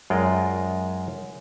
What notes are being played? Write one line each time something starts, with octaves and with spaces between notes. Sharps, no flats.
F#2 G#3 F4 A#4 D5 G5